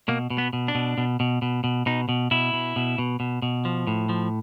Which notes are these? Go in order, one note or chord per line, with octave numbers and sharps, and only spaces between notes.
B2 A#3
B2
B3
B2
D4
B2
B2
B2
B2
B2
B2 D#4
B2
B2 E4
B2
B2
B2
B2
B2
F3
A2
F3